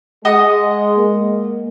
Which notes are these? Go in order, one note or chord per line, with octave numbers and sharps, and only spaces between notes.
G#3 D#5 F#5 D#6
A#3